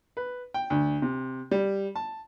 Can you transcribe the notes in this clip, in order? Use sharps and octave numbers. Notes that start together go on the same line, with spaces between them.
B4
G5
D2
C3
G3
A5